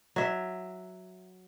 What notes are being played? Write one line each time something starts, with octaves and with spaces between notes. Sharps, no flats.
F#3 E5